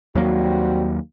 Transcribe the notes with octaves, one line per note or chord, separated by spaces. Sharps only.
D#2 F#3 G3 A#3 C4 F#4